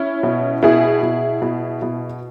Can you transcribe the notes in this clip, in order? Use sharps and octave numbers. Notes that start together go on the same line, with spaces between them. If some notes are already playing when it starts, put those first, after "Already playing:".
Already playing: C#4 E4
B2
B2 E4 G#4
B2
B2
B2